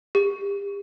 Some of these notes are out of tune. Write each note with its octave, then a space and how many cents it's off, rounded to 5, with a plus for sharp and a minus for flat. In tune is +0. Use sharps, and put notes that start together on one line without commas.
G4 +35